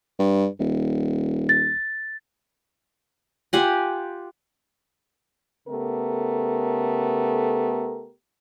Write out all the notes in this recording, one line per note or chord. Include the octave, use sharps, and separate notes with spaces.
G2
D#1
A6
F4 G4 F#5 G#5
C#3 A3 B3 G4 A4 A#4